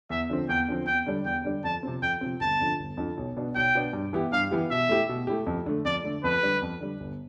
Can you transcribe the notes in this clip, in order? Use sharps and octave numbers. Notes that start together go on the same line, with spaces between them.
E2 E5
D3 F3 C4
E2 G5
D3 F3 C4
E2 G5
D3 G3 D4
E2 G5
D3 G3 D4
F2 A5
C3 F3 C4
F2 G5
C3 F3 C4
G1 A5
F2 D3 F3
G1
F2 D3 F3
B1
B2 B3 D4
B1 G5
B2 B3 D4
G2
E3 B3 E4 G4
G2 F5
E3 B3 E4 G4
B2 E5
A3 E4 G4
B2
A3 E4 G4
F2
D3 A3
F2 D5
D3 A3
F2 B4
D3 G3
F2
D3 G3
G1